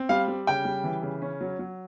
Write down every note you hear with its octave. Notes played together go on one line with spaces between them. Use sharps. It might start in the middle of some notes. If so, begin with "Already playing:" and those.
Already playing: C4
G3 F5
G3
C#3 G5
G3
E3
C#3
C#4
F#3
F#3